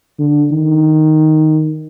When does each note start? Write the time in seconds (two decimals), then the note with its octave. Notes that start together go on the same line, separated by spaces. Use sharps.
0.19 D3
0.51 D#3